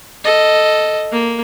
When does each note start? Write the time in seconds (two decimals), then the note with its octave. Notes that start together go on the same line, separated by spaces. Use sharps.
0.25 A4 D#5
1.12 A#3